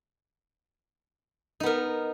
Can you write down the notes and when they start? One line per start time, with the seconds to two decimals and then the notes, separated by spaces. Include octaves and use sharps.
1.60 D#4
1.63 B3
1.66 A#4